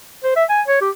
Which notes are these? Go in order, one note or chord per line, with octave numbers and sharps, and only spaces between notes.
C5
E5
G#5
C#5
G4